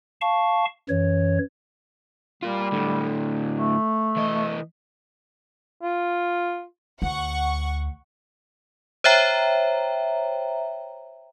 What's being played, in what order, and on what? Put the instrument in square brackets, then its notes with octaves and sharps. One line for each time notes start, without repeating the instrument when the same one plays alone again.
[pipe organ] F5 A5 C#6
F#2 E3 C#5
[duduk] G3 [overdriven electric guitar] F4 A#4
[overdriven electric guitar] A2 D3
[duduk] A3
[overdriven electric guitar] E3 D#5
[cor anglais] F4
[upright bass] D2 [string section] F#5 C#6
[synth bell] C5 C#5 E5 G5 A#5